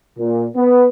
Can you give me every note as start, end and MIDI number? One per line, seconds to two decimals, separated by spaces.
0.18 0.46 46
0.56 0.88 59